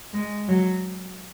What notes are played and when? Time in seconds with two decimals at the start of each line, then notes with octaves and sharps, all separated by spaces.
0.13 G#3
0.48 F#3